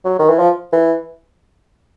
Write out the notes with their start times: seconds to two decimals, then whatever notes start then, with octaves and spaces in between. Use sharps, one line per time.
0.05 F#3
0.19 D#3
0.29 E3
0.39 F3
0.73 E3